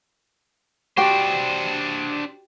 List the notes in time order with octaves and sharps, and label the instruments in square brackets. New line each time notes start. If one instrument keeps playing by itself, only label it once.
[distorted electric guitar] D4 C5 [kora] F#4 G4 G5